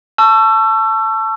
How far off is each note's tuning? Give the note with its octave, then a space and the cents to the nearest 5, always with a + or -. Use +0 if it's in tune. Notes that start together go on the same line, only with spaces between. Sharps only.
A5 +0 C#6 +10 E6 +30